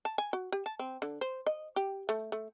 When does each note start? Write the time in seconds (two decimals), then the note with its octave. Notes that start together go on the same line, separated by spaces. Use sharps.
0.05 A5
0.18 G#5
0.33 F#4
0.52 G4
0.66 A5
0.79 C4
1.02 D3
1.21 C5
1.46 D#5
1.76 G4
2.09 A3
2.32 A3